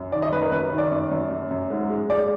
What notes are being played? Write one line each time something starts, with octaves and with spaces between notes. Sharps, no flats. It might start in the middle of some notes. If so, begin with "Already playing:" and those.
Already playing: F#2
D#3 D5
D#5
F#2 B4
A#4
F#2 B4
D#3
D5
F#2
F#2
F#2
F#2
G#2
G#3
G#3 D5